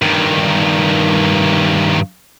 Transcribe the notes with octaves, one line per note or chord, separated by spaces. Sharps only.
G2 D#3